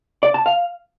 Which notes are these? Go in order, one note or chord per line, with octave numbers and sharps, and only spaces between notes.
D5
A5
F5